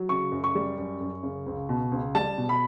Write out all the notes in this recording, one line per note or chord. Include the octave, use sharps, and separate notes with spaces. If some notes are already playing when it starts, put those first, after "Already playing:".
Already playing: F#3
C#3 C#6
F#2
C#6
G3
F#2
F#2
C#3
C#2
B2
C#2
G3 A5
B2
B5